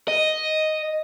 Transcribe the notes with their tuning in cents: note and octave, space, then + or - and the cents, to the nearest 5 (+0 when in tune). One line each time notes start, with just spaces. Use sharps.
D#5 +0